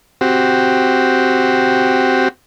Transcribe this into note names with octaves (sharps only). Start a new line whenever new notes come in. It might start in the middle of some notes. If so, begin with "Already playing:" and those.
C4 F#4 G4